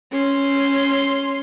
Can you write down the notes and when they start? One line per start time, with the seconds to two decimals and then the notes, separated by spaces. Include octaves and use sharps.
0.12 C#4 C6